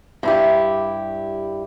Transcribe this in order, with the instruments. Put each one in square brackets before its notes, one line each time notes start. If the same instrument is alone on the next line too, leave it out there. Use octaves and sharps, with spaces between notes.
[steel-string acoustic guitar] G2 E4 G4